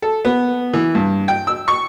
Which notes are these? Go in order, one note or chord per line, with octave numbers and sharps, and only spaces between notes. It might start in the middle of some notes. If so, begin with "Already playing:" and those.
A4
B3
E3
G2
G5
E6
C#6